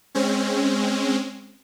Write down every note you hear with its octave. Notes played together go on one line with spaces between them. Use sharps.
G#3 C4 C#4